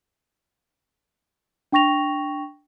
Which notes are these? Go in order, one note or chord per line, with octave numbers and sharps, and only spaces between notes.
D4 G5 C#6 A#6 F7